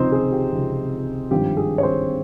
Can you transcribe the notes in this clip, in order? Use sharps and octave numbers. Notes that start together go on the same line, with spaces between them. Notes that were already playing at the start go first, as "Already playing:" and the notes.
Already playing: C#2 C3 F3 C4 D#4 C5 D#5
G#4
G4
C#2 C3 F3
G#1 G2 F3 G4
G#4
C#5
C4 C5